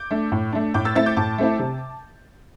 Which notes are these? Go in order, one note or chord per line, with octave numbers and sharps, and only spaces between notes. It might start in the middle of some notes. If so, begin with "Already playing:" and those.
Already playing: D6 G6
A3 D4
A2
A3 D4
A2 D6 G6
E6 A6
A3 C4 E4 E6 A6
D6 G6
A2 A5 D6
A3 C4 E4
C3